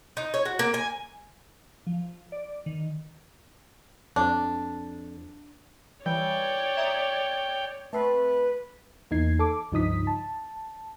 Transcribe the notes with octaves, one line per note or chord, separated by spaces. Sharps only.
D#4
C#5
F#4
A#3
G#5
F3
D5
D#3
F2 D4
E3 G3 C#5 D5 G5
E5 A#5 D#6
A3 C4 B4
E2 A#3 D#4 G#6 C7
A4 D6
C#2 G2 F3 D#4 D#6 B6
A5